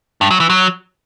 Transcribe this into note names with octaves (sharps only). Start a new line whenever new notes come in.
G2
F#3
E3
F#3